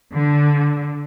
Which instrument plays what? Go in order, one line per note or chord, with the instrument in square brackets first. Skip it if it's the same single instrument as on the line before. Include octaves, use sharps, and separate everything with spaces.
[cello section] D3